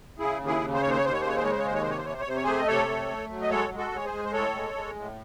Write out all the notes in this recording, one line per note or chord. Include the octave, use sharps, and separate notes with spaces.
C#3 E4 G#4
D#2
E4 G#4
C#3
C5
D#2 C#5
C5
C#5
D#2 C5
C#5
C#3 C5
C#5
C5
G#3 C#5
C5
C#5
D#2 C5
C#5
C3 C5
C#5
C5
C3 C#5
C5
C#5
C3 C5
C#5
A3 G#4 C5
D#5
C3 A4 C#5
A3
A3
F#3
D#5
G#3 A4 C#5
G#3
F#4 A4
G#3 C#5
G#4 C5
G#3
C5
A2 A4 C#5
G#3
G#3
A2